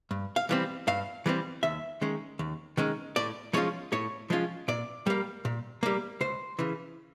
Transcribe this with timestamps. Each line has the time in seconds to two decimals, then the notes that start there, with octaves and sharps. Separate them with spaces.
0.11 G2
0.36 F5
0.49 E3 G3 C4
0.87 G2 F5
1.26 E3 G3 C4
1.63 D#2 E5
2.01 D#3 G#3 C#4
2.39 D#2
2.77 D#3 G#3 C#4
3.16 A2 D5
3.53 F3 G#3 C#4 F4 C#5
3.92 A2 C#5
4.30 F3 G#3 C#4 F4
4.68 A#2 D5
5.06 G3 A#3
5.45 A#2
5.83 G3 A#3
6.21 C#2 C5
6.59 C#3 E3